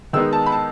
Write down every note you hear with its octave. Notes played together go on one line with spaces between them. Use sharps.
D#3 G#3 B3 D#4 E6
A5
B5
A5